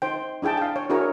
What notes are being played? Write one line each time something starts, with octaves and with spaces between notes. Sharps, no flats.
D#4 C5 G5
D4 E4 G#4 G5 A5
F5 G5
C#5
D4 E4 F#4 G#4 A#4 C#5